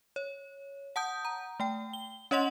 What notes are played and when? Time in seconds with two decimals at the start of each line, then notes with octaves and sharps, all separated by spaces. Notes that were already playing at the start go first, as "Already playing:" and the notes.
0.16 C#5
0.96 F#5 A5 D#6 G6
1.25 A#5
1.60 A3 G5
1.93 G7
2.31 C#4 C#5 D#5 F#5 C6 F#7